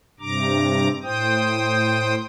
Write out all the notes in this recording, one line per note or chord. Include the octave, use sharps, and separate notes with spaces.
G2 C3 A#5 D6
A2 C5 G5 D#6